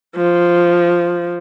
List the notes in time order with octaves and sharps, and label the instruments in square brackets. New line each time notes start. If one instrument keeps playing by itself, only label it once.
[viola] F3